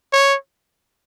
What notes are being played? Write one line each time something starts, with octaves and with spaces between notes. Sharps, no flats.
C#5